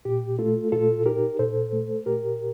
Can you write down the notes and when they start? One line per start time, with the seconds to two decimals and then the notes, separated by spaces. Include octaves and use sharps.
0.05 A#2 G4
0.39 A3 F4 A4
0.72 A#2 F4 A4
1.06 D#4 G4 A#4
1.39 A#2 A4 C5
1.73 A3
2.06 A#2 G4 A#4